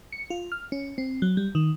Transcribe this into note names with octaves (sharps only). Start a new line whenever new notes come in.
C#7
F4
F6
C#4
C4
F#3
G3
D#3